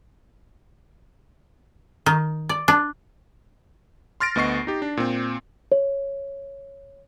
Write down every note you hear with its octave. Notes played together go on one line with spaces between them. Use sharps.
D#3
D5
D4
C6 F6 A6 A#6 D7
D2 B3 D#5 C#6 C7
D#4 G4
D4
A#2 C4
C#5